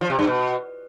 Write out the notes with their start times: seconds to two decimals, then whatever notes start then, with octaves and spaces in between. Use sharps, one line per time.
0.01 F3
0.10 C3
0.19 G2
0.27 B2